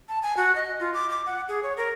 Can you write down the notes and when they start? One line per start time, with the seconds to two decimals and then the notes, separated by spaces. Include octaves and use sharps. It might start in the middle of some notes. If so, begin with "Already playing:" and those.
0.09 A5
0.23 G#5
0.37 F#4
0.55 D#5
0.80 F4
0.94 D6
1.10 D6
1.26 F#5
1.48 G#4
1.63 C#5
1.77 A#4